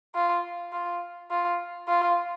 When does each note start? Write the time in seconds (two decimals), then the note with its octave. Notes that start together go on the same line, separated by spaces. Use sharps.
0.15 F4
0.73 F4
1.31 F4
1.88 F4